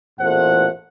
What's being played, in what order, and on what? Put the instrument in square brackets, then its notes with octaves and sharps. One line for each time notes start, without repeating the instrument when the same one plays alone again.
[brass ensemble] A1 E2 A#2 A3 C5 F#5